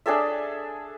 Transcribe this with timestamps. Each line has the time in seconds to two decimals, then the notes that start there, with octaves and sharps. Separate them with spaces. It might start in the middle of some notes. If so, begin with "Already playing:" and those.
0.06 D4 G#4 A4 E5